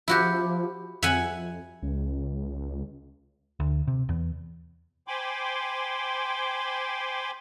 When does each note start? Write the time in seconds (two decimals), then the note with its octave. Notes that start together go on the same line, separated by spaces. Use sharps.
0.08 F3 E4 F#4 G4
1.03 F2 E5 F#5 G#5
1.82 C#2
3.60 D2
3.87 C3
4.09 E2
5.08 C5 G5 G#5 B5 C6 D6